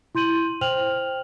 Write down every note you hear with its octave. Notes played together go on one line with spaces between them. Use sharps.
E4 C6 G6 D#7 F#7
C5 G5 F6 F7 F#7